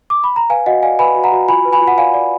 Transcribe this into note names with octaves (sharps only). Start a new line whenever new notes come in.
D6
B5
A#5
B4 F5 G#5
F#4 D#5 F#5
D5 F5 G#5
B4 G#5 B5
F#4
F#5 A#5
F#4
F4 G#5 B5
B4
G#5 B5
F4
F#5
D5 F5 G#5
D5